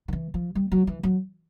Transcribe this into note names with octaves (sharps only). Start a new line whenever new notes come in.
D#3
E3
F3
G3
F#3
E3
F#3